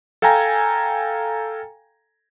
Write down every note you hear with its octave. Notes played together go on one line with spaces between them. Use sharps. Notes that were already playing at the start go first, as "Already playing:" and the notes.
A4 F5 G5 G#5 A#5